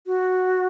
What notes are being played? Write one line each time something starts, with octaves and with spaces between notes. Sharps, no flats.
F#4